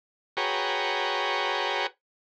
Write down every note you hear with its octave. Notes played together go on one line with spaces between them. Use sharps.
F#4 G#4 B4 C#5 G5 A#5